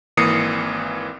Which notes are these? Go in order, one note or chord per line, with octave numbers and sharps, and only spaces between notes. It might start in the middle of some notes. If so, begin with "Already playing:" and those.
G#1 E3 A#3 D#6 C7 C#7